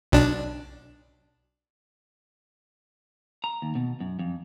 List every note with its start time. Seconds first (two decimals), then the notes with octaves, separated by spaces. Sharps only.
0.12 B1 D4
3.44 A#5
3.62 D#2
3.75 B2
4.00 F#2
4.19 F2